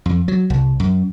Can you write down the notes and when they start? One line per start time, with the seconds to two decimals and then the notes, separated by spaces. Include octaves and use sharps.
0.06 F2
0.28 F#3
0.50 C2
0.80 F#2